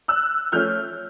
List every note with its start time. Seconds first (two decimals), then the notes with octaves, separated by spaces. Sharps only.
0.08 E6 F#6
0.52 F3 A3 C#4 F6 G6